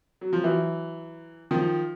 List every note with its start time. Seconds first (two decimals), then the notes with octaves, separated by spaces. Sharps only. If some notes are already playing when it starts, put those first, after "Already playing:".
0.21 F#3
0.33 F3
0.43 E3 F#3
1.51 D#3 F3